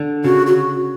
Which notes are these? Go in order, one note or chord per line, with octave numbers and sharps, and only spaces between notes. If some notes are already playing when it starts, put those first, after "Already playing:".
Already playing: D3
C#3 F#4
F#4